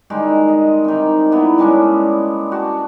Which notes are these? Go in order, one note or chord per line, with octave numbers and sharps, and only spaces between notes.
D#3 G3 G#3
D#5
C3 D#3
A#3 B3 E4
G3 G#3 C#4 D4
F#4 G4 A5